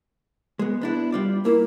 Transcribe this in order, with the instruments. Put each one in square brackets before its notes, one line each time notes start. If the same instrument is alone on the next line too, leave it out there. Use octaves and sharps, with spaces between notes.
[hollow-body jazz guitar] G#3 B3
B3 D4 E4
G3 F4 D5
[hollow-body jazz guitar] A#3 E4 [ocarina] A#4